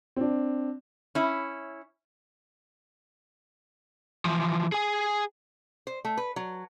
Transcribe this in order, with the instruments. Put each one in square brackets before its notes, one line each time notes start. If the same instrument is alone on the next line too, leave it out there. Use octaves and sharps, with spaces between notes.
[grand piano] C4 D4
[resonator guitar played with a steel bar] C#4 E4
[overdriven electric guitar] E3 F3
G#4 G#5
[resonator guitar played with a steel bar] C5
A3
B4
F#3